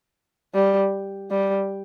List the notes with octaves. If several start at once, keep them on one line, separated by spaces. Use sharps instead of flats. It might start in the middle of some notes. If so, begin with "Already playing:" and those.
G3
G3